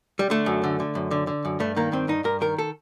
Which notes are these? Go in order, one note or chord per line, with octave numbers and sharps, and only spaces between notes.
G3
D3 A3
F#2
D3
D3
F#2
D3
D3
F#2
G2 A3
D#3 A#3
G2 C4
G2 D#4
G2 A#4
D#3 A#4
A4